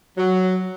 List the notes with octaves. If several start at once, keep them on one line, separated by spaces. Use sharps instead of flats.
F#3